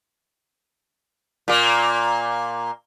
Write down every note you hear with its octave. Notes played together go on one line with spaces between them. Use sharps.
A#2 A#3